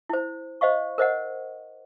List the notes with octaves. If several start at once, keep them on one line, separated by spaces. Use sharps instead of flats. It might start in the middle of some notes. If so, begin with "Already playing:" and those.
E4 C5
C5 D#5 F5 C#6
A#4 C5 D#5 F#5